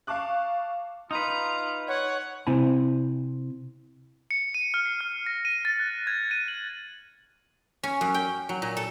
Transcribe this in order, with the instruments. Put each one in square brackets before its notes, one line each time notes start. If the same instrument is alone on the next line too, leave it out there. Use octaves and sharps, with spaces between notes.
[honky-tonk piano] F5 A5 C#6 D6 F#6
[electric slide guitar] D#4 B4 [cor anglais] F4 [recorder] A#5
[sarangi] C#5 [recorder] F#5
[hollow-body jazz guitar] C3 C4 E4 G#5 A5 B5
[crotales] C#7
D#7
F6
C7
F6
A#6
D#7
A6
F#6
G#6
D#7
F#7
[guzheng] C#4
F#2
G5
F#3
A#2
A4